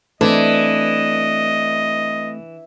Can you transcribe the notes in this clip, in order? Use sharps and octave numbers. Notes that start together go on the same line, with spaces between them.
E3 A3 C4 D4 D#5